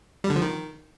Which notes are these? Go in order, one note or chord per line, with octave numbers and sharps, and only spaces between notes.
G3
D3
F3
D#3